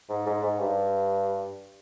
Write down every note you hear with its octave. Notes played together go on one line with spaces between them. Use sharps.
G#2
G#2
G#2
G2